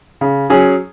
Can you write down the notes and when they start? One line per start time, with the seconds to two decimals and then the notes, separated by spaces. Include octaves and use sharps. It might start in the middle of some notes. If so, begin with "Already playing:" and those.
0.21 C#3
0.50 F#3 C#4 G#4